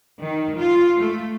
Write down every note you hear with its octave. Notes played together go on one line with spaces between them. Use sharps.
D#3
F4
A3